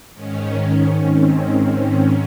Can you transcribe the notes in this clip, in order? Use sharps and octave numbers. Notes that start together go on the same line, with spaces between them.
G#2 D#3 C#4
C4
C4
G#2 C#4